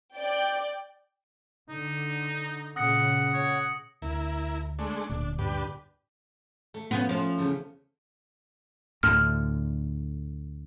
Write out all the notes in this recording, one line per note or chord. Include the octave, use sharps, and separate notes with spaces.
D5 G5
D3 D#4
A#2 C#3 F#5 D#6 A#6 C#7
C#5
D2 E4 A#4
G#3 A3 D4
D1 D2 A#2 D4
G2 D4 G4 B4
A3
F3 B3 C#4
F3 A3
E2 C#3 A3
D2 A2 D3 F6